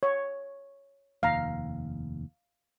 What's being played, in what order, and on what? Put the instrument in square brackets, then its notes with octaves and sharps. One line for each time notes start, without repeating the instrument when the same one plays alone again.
[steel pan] C#5
[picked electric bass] F1 D#2 [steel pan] F5 A#5